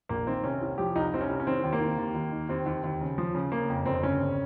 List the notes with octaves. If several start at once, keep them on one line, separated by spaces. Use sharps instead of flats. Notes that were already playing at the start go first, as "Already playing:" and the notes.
A#1 A#3
D#3 C4
C3 C#4
C2
F3 G4
C2 D#4
C2 C4
C#4
C2
C#4
D#3 C4
D#2
A#3
D#2
D#2
D#2
D#3
D#2 C4
D#2
D#2
C#3
F3
C#3
C#3 A#3
F2
G1 C4
C#3 C#4
G1